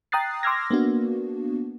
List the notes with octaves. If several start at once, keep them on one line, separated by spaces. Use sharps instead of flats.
G5 A#5 D#6 F#6 A6 C7
C6 D6 E6 F6 G#6 A#6
A#3 B3 D4 F#4